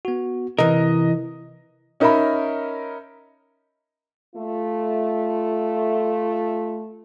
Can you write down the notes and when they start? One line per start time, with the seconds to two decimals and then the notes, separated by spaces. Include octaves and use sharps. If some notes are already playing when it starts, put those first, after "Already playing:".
0.05 B3 F#4
0.58 C3 E3 A#4 D#5
2.00 C#4 D#4 A#4 E5 A#5 B5
4.36 A3 F4